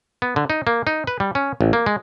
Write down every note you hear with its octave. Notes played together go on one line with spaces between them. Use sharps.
B3
D3
D#4
A#3
D#4
B4
G3
C#4
A1
A#3
G#3